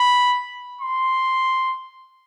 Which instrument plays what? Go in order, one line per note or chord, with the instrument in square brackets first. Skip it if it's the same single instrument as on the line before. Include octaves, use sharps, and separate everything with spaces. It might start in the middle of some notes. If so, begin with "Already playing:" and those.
Already playing: [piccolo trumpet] B5
C6